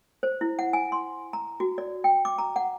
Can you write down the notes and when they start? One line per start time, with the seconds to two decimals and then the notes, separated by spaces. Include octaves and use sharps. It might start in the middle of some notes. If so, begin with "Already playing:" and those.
0.23 C5
0.41 E4
0.59 F#5
0.73 G#5
0.92 C6
1.33 A#5
1.60 F#4
1.78 D5
2.04 G5
2.25 D6
2.38 A#5
2.56 F#5